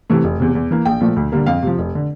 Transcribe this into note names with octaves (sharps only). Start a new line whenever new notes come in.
C3 E3 A3
F1
E2 C3
E2
E3 A#3
A#1 G5
A#2 F3 A3
D2
D3 G3 A#3
F2 F5
C3 F3
F1
D3